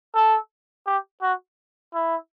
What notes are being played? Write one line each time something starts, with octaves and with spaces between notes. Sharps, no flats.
A4
G4
F#4
E4